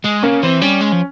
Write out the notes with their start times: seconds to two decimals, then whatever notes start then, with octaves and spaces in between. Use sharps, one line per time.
0.04 G#3
0.23 C#3 A#3
0.43 E3 C4
0.62 G3 C#4
0.81 G#3
0.92 F3